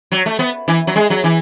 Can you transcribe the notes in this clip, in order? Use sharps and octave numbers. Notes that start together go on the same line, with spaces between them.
F#3
A3
B3
E3
F#3
G#3
F#3
E3